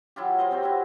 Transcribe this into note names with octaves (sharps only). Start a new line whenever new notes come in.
F#3 E4 F4 G4
F4 A#4 C5 D#5
C3 C4 G5 C#6
E4 F#4